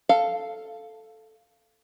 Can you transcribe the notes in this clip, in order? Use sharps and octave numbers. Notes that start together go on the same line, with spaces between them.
A4 F5